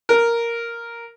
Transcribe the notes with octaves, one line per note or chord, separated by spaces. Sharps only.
A#4